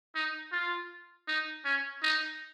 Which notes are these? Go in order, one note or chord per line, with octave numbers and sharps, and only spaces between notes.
D#4
F4
D#4
C#4
D#4